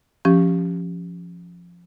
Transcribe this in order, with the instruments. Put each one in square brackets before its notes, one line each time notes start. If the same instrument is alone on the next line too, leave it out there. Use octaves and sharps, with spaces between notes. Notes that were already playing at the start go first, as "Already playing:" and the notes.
[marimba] F3 C#4 G4